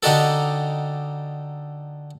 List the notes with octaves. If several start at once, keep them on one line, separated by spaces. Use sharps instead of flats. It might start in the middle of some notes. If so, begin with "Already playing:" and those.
D3 D#4 F#4 G4 A4